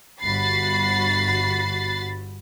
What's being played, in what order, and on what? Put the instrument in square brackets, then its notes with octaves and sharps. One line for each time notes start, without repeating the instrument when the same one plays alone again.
[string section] G1 F#4 B5 A6 C7